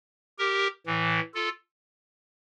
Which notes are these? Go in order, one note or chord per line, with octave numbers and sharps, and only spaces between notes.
G4 A#4
A2 E3
F4 A4